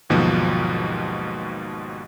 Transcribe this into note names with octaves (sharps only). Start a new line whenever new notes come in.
G#1 D#2 G#2 B2 F3 F#3